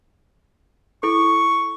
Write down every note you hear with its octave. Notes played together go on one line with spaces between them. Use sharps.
E4 A4 C#6